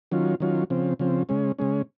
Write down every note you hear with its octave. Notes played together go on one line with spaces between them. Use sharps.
D#3 F#3 C#4 F4
D#3 F#3 C#4 F4
C#3 F3 C4
C#3 F3 C4
C#3 G#3 C#4
C#3 G#3 C#4